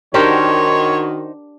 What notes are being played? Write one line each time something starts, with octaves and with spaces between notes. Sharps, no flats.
D#3 D4 D#4 F#4 G4 A#4 C5 C#5